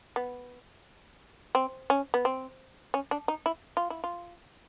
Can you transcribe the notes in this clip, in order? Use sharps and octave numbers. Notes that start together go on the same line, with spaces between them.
B3
C4
C#4
B3
C4
C#4
D4
D#4
E4
F4
E4
F4